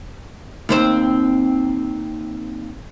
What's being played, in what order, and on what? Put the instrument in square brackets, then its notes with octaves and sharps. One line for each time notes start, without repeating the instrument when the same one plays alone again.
[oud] D#2 C4 C5